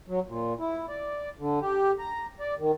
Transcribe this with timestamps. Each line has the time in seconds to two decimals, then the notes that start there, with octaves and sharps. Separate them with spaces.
0.08 F#3
0.27 A#2
0.59 E4
0.89 D5
1.39 D3
1.61 G4
1.99 A#5
2.40 D5
2.59 D#3